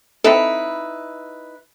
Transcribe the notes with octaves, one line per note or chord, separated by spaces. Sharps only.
C4 D#4 E4 A4 B4